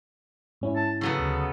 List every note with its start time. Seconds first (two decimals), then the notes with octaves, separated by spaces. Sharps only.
0.61 G#2 C#4 E4
0.76 A5
1.01 C#3 F#3 B3 A4
1.19 D2